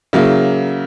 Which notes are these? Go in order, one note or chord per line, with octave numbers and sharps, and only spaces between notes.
C#3 F#3 A#3 E4